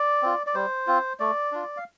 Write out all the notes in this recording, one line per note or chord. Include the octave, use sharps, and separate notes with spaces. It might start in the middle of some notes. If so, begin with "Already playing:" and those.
Already playing: D5
C4 F4
D5
G3 C5
C4 F4
A3 D5
D4 F4
F5